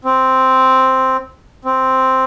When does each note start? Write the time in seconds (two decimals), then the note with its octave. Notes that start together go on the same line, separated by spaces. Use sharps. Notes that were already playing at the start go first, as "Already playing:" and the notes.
0.05 C4
1.65 C4